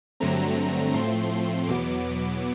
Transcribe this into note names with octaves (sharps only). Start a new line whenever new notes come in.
G2 D3 F#3 A3 C4 A#5
A2 F3 A3 C4 C6
E2 B2 F#3 B3 D6